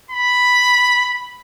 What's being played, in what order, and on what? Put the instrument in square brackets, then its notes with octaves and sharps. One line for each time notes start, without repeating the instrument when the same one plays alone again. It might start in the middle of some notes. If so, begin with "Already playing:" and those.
[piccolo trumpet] B5